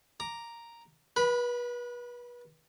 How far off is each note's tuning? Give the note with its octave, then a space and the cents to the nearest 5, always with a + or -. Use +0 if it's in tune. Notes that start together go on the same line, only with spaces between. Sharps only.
A#5 +0 D6 +0
B4 -35 B5 +0